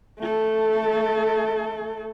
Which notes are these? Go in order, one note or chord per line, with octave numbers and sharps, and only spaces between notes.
A3 A4